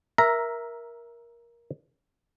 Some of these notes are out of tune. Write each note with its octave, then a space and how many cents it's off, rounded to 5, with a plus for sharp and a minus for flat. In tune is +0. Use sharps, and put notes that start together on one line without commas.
A#4 +15 E5 +0 A#5 +0